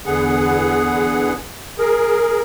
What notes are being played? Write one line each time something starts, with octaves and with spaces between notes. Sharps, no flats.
E2 D3 B3 G#4 F#5
G#4 A#4